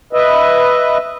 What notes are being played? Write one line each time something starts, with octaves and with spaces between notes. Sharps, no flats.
B4 D#5 E5